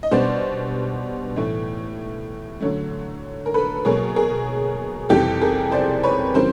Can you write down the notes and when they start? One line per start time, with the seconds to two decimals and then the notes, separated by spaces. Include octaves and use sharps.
0.03 D#5
0.11 B2 G3 B3 D4 C5 D5
1.36 A2 E3 A3
2.60 D3 F#3 A3
3.46 A#4
3.54 A4 B4
3.85 B2 F#3 A#3 G#4 A#4
4.16 G#4 A#4
5.09 F2 C3 E3 G3 C4 G4 A4
5.41 G#4 A#4
5.72 C5 D5
6.03 B4 C#5
6.34 C#3 E3 G3 C4 A#4 C5